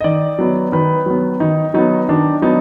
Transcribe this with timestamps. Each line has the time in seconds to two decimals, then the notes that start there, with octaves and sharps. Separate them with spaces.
0.01 D#5
0.04 D#3 D5
0.39 F#3 B3
0.72 D#3 B4
1.06 F#3 B3
1.40 D#3 D#4
1.74 F#3 B3 D#4
2.09 D#3 D4
2.42 F#3 B3 D#4